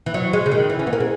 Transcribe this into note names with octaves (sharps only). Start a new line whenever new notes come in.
E3
F#3
G#3
C#3
D#3
E3
C#4
B3
A#3
G#3